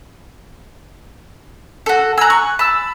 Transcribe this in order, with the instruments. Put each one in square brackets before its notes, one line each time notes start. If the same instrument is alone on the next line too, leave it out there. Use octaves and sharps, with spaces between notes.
[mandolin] F#4 A4
[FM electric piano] G#5 F#6 [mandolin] A#5 E6
[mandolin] C#6
[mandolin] A5 [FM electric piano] B5 E6